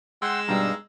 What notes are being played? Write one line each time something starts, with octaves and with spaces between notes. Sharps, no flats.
G#3 F#5 G5 C6 E6
G2 B2 G3 D#4 F5 A#5